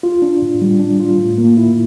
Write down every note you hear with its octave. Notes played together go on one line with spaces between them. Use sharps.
F4
D4
A2
G3
D4
F4
A2
A#3
E4